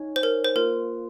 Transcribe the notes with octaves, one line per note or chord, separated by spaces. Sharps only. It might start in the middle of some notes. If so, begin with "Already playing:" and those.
Already playing: D#4 C#5 G#5
C5
A#4
C5
A#3 F4 A#4